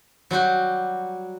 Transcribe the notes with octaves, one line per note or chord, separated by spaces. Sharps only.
F#3 G3 F#4 G4